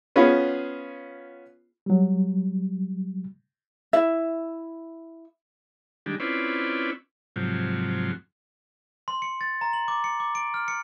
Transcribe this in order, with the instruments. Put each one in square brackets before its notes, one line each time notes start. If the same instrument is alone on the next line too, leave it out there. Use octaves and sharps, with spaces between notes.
[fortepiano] B3 C#4 F4 G#4
[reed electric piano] F#3 G3
[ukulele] E4 E5
[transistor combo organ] D#3 G3 G#3 D4
C4 C#4 E4 F4 B4 D5
G#2 C3 F3 F#3
[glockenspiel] C6
C#7
A6
A#5
F#7
D6
C#7
D6
D7
F6
C#7